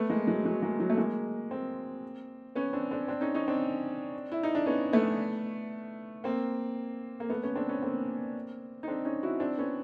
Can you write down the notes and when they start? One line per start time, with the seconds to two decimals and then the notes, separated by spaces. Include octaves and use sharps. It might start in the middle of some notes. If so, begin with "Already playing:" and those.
Already playing: A3 B3
0.10 G#3 A#3
0.27 F#3 G#3
0.45 F#3 G#3
0.62 G#3 A#3
0.79 F#3 G#3
0.90 A3
0.97 G#3 A#3
1.51 A#3 C4
2.55 B3 C#4
2.73 C4 D4
2.91 C4 D4
3.08 C4 D4
3.21 C#4 D#4
3.35 C#4 D#4
3.48 C4 D4
4.32 E4
4.43 D#4
4.55 D4
4.66 B3 C#4
4.93 A3 B3
6.24 A#3 C4
7.20 A#3
7.30 A3 B3
7.43 B3 C#4
7.56 C4 D4
7.69 B3 C#4
7.82 A#3 C4
8.83 D#4
8.88 C4 D4
9.05 C#4 D#4
9.23 E4 F#4
9.40 C4 D4
9.58 B3 C#4